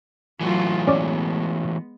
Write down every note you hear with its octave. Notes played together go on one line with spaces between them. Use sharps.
E3 F#3 A3 F4 F#4
G#3 B3 C#4 D5